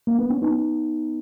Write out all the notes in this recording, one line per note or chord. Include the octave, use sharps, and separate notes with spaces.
A#3
B3
C#4
B3 D#4